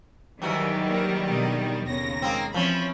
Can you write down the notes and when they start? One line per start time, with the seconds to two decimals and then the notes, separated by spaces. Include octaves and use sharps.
0.42 G#2 D#3 E3 F#3 G3 F#4
0.88 A#3 A#4
1.28 B2 D3 D#5
1.87 D#2 C#3 B3 C#5 A#6
2.22 G#3 A#3 C4 G#4
2.54 E3 F3 C4 C#4 C#5 B5